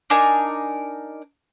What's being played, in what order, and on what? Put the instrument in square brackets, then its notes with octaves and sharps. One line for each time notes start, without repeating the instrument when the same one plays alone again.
[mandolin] D4 D#4 A#4 G#5